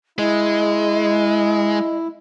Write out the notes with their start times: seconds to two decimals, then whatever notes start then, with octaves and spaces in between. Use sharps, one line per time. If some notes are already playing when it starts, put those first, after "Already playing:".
0.19 G#3 E4 D#5